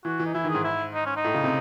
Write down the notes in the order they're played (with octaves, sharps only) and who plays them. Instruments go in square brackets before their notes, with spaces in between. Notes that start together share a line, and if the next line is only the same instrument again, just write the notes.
[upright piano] E3 [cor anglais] F#4
[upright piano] E3
[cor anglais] D#4
[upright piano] E3 [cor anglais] E4
[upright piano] D#3
[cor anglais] G#4
[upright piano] G#2
[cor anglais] E4
D#4
C#4
D#4
[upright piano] A2
C#3
C3